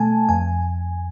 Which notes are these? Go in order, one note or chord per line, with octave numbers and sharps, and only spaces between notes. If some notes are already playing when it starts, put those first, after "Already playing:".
Already playing: B2 A3 G#5 A5
F2 G#5